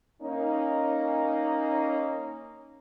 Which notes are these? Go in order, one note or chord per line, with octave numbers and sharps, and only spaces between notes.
A#3 C#4 D#4